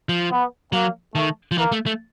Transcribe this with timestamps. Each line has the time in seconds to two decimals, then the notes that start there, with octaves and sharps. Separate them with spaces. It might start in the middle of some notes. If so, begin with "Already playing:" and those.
0.09 F3
0.31 B3
0.73 F#3 A#3
1.15 D#3 A3
1.51 F3
1.58 E3 A#3
1.72 A3
1.86 A3